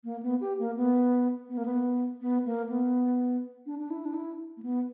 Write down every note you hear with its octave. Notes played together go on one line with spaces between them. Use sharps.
A#3
B3
G4
A#3
B3
B3
A#3
B3
B3
A#3
B3
D4
D4
E4
D4
E4
A#3
B3